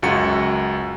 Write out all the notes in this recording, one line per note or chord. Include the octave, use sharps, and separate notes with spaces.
C#2 F#2 F#4 C#7